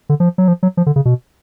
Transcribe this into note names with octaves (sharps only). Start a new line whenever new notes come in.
D3
F3
F#3
F3
F#3
F3
D3
C#3
B2